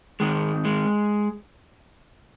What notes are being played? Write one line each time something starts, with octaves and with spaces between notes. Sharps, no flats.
G#2 D#3 G#3
G#3